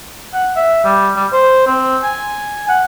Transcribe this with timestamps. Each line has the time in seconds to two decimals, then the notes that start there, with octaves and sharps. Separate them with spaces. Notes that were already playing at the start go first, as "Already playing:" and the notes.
0.34 F#5
0.56 E5
0.85 G3
1.16 G3
1.33 C5
1.67 C4
2.03 G#5
2.69 F#5